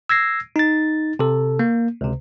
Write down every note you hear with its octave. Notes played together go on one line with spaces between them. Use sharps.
E6 G#6 A#6 C7
D#4 A6
C3 A4
A#3
C#2 C3